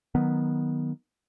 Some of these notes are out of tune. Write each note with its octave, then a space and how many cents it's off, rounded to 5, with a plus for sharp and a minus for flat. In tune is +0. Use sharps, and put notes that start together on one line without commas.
D#3 +0 F#3 +0 B3 -10